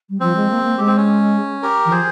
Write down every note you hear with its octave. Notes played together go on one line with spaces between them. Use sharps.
G3
F3 C4
G#3
A#3
A#3
G#3 G4
C4
C#4
G4 A#4
E3
F3 G#4 C5